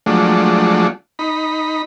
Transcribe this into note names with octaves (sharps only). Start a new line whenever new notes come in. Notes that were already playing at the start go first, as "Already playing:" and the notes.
F3 F#3 G#3 A3 D4
D#4 B5